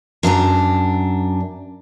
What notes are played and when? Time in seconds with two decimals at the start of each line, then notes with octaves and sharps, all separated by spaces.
0.23 F#2 D4 A5 A#5